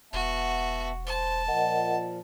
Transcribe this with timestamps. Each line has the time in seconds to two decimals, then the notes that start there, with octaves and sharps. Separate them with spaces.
0.13 E1 B3 F#4 E5 A5
1.07 C5 A5
1.48 A#2 F3 A#4 D#5 F#5